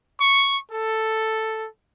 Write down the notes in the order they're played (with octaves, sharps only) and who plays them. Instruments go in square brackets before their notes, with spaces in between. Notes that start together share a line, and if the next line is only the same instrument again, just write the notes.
[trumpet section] C#6
A4